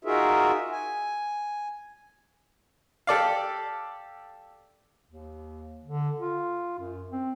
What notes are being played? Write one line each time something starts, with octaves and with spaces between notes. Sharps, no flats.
D#4 F4 F#4 G#4 A#4 E5
G#5
G4 A4 D5 F5
D#2
D3
F4
F#2
C4